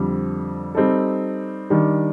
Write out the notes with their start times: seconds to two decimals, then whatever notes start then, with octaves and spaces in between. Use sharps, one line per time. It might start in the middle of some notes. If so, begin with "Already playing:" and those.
Already playing: F2 D3 G3 C4
0.75 G3 C4 D#4 A4
1.70 D#3 G3 D4